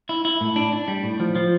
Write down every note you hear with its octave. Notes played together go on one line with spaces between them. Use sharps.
E4
E4
A2
D4
D4
G3
A2
F3
F3